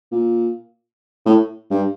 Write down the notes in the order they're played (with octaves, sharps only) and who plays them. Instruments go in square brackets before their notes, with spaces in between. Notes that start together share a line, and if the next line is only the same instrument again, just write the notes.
[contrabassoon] A#2
A2
G2